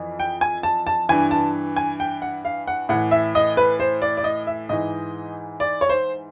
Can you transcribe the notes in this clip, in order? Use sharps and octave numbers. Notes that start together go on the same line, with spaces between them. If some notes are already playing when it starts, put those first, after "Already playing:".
Already playing: F2 E3
G5
G#5
A5
A5
G2 E3 G#5
A5
G#5
G5
F#5
F5
F#5
A2 E3 F#5
E5
D#5
B4
C5
D5
D5
D#5
E5
G#2 E3 D#5
D5
C#5
C5